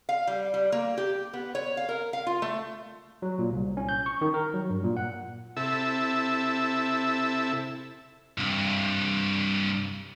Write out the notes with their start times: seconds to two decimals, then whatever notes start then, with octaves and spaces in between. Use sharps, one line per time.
0.09 F5
0.27 G3
0.54 G3
0.72 A#3
0.98 G4
1.33 B3
1.55 C#5
1.77 F5
1.89 A#4
2.13 F5
2.27 F4
2.42 A3
3.22 F#3
3.39 A#2
3.51 C2
3.77 C#4
3.89 G6
4.06 C#6
4.21 D#3
4.34 A#4
4.54 F#3
4.70 G2
4.84 A#2
4.97 F#5
5.57 C3 E4 A4 E5
8.38 C2 G2